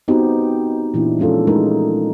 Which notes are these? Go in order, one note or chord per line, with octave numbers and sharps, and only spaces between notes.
B3 C4 D#4 F#4 G4
A#2 E3 D4 E4
F3 G#3 C#4 F4 A4
G#3 A3 D#4 A#4